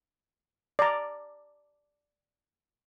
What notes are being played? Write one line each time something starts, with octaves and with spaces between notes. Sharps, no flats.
D5 A#5